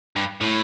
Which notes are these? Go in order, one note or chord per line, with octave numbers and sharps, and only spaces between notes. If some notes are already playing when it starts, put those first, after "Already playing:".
G2
A2